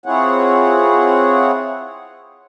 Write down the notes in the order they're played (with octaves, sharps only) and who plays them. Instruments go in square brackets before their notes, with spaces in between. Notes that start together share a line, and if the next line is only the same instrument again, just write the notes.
[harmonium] C4 E4 F4 G#4 C#5 F#5